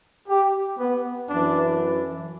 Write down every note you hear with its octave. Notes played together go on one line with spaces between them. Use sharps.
G4
B3
F#2 E3 D4